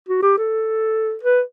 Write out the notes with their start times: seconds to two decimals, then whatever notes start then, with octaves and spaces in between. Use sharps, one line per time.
0.08 F#4
0.22 G4
0.37 A4
1.23 B4